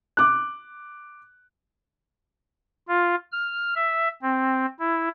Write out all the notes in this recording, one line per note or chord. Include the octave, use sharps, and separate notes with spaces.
D6 F#6
F4
F6
E5
C4
E4